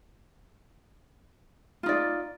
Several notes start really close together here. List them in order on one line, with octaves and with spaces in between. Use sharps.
F4 D#4 D5